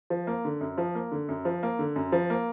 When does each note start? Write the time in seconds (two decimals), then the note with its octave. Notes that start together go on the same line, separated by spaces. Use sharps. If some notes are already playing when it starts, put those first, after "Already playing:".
0.10 F3
0.27 A#3
0.45 D3
0.61 F#2
0.78 F3
0.95 A#3
1.12 D3
1.29 F#2
1.45 F3
1.63 A#3
1.79 D3
1.96 F#2
2.12 F3
2.30 A#3